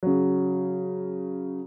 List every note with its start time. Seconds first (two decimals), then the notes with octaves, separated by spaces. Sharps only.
0.03 C#3 F#3